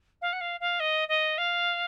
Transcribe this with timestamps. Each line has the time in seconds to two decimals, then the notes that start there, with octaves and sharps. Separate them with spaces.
0.21 F5
0.33 F#5
0.41 F5
0.60 F5
0.80 D#5
1.08 D#5
1.38 F5